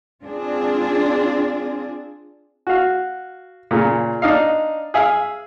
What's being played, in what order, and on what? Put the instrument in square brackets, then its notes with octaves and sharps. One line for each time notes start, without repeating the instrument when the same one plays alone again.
[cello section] C4 D4 F4 G#4
[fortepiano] F#4 F5
A#2 C#3
D4 D#4 D#5 F5
G#4 E5 F5